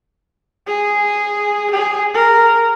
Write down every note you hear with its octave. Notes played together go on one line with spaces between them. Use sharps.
G#4
G#4
A#4